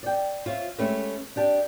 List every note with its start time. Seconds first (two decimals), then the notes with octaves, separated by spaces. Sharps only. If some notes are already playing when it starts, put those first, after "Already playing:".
0.03 D5 G5
0.46 F4 C5 C#5 E5
0.78 G#3 A3 C#4 G4 B4 E5
1.36 D4 G4 A5